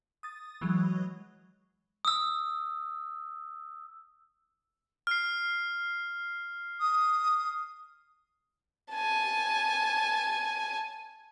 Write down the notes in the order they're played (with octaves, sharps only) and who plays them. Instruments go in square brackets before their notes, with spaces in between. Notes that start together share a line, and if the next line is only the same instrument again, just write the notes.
[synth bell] D#6 A6
E3 F#3 G#3
[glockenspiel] D#6 E6
[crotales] F6 C7
[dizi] D#6
[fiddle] G#5 A5